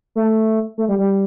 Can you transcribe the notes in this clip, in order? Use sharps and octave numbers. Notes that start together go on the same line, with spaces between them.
A3
A3
G3
G3